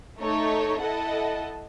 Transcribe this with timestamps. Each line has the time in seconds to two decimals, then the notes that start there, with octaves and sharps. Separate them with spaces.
0.19 A3 D#4 A4 C#5
0.81 E4 A4 D#5 F#5 A5